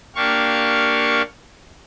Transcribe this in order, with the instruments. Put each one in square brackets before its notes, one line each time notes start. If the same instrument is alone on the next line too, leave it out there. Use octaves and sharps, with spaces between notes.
[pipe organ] A#3 D4 G4 F5 C#6